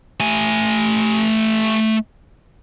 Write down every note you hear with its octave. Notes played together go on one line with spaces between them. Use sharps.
A3 G#5